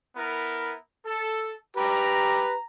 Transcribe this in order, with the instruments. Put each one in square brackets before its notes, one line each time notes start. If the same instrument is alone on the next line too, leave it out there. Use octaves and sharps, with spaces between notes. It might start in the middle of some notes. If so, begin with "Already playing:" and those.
[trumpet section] B3 E4 A#4
A4
[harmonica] G4 B4 [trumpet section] A#5